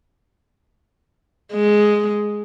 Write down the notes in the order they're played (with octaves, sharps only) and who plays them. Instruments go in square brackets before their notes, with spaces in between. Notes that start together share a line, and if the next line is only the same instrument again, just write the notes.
[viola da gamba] G#3